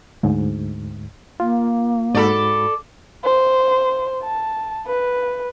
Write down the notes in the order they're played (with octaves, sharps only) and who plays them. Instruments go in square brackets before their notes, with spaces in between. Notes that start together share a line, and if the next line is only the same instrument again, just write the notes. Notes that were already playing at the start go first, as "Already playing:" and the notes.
[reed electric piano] D2 G#2
[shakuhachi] A#3 [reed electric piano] F4
[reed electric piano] G#2 F#4 B5 [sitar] A4 D5
[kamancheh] C5
A5
B4